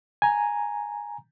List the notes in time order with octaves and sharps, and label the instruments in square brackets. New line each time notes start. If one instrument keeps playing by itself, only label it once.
[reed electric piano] G#5 A#5